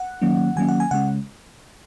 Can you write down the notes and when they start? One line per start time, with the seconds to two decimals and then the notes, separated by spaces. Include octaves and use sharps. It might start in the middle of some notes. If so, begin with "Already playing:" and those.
Already playing: F#5
0.22 D#3 F#3 A#3 C#4
0.56 D#3 F#3 A#3 C#4 G#5
0.68 F#5
0.80 G#5
0.91 C#3 G#3 C#4 F#5